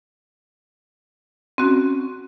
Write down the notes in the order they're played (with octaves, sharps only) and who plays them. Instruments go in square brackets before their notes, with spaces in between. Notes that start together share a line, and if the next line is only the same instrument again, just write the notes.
[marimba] C4 C#4 F#4